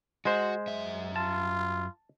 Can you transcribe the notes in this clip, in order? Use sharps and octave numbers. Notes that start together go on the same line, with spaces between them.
G#3 F#4 C5
F#2 E5
F4 A5